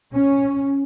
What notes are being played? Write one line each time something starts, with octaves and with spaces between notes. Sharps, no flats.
C#4